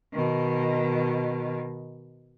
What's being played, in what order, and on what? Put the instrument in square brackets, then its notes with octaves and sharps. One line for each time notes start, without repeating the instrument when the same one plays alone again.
[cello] B2 D#3